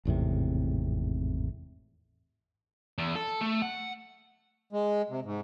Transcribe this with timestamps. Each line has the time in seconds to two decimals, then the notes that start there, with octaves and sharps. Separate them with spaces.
0.05 G#1 E2 A2 C3
2.98 E2
3.16 A4
3.41 A3
3.62 F#5
4.73 G#3
5.10 C3
5.25 G#2